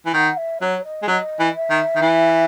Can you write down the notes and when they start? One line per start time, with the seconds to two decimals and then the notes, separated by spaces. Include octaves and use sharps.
0.06 E3
0.14 D#3 F#5
0.37 E5
0.61 F#3 C#5
0.84 D#5
1.02 G#3
1.08 F#3 D#5
1.40 E3
1.55 E5
1.70 D#3
1.95 D#3
2.01 E3